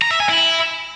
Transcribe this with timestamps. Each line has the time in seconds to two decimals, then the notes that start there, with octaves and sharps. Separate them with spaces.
0.02 A#5
0.11 E5
0.20 G#5
0.29 E4